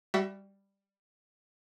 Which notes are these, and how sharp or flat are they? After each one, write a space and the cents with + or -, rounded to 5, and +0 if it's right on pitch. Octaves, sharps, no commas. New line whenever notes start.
G3 +10 F#4 +40 E5 +5